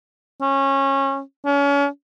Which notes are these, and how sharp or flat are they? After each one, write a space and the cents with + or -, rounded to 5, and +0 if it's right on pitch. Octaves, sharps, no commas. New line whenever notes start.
C#4 -20
C#4 +35